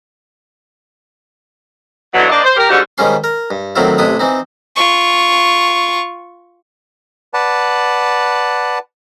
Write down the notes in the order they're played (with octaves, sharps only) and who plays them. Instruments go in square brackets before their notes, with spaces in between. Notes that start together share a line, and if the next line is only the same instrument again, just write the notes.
[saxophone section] B2 D3 E3 F#3
A#3 D4 C5 D5 D#5
C5
G4 A#4
G#2 D3 G3 C#4 F#4 G4
[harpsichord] G#2 D#3 G3 C#4 C6
A#4
G2
A2 D#3 F#3 C4 E4 F4
A1 C3 D4 E4 D#6
E3 C4 D#4
[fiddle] F4 C#6
[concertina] B4 D5 F#5 A5